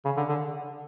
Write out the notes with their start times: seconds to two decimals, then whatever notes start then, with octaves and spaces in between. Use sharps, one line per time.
0.05 C#3
0.17 D3
0.29 D3